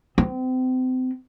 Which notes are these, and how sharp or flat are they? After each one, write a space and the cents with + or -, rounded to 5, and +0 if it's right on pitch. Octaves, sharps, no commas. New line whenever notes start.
C4 -35